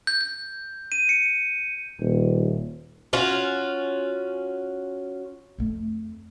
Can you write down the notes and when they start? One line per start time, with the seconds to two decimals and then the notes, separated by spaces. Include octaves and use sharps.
0.07 G6
0.21 G6
0.92 D#7
1.09 C#7
2.00 D#1
3.13 C#4 F4 F#4
5.58 F2 A3